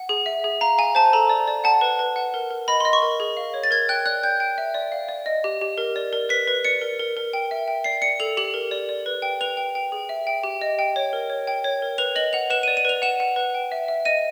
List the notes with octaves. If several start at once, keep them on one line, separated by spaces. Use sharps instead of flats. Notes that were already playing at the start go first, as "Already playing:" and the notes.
Already playing: F#5
G#4
E5
G#4
F5 A#5
F5 G#5
C5 A5
A4 A#5
D5
D5
F#5 A5
B4
B4
F#5
A#4
A#4
D#5 B5
D#5 C6
C#6
A#4
G#4
F5
C#5
A6
A#4 G#6
G5 F#6
D5 F#6
G5 G6
G5
E5
D5
F5
D5
D#5
G4
G4
A#4
D5
A#4
B4 B6
B4
D5 C#7
A#4
A#4
A#4
G5
E5
G5
D5 C7
D5 C#7
A4 F7
G4 F#7
A#4
D5
D5
B4
G5
B4 F7
G5
G5
G#4
E5
G5
G4
D#5
G5
C#5
A#4
C#5
G5
C#5
A#4
B4 F7
D#5 F#7
F#5 F7
B4 E7
D5 D#7
D#7
B4 F7
F#5 E7
F#5
B4
G5
E5
E5
D#5 D#7